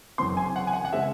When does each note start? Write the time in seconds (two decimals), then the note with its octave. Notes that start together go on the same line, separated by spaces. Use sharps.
0.18 F#1 F#2 E3 C4 C6
0.37 G#5
0.56 F#5
0.67 G#5
0.73 F#5
0.85 F#5
0.93 C#3 G#3 C4 E5